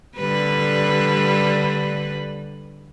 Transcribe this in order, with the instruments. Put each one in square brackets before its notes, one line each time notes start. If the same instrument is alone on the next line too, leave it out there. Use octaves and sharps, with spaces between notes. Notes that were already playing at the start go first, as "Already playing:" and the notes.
[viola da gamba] D3 G3 B4